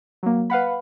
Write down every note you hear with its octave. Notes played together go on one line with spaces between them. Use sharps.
F#3 A#3
B4 F5 F#5 B5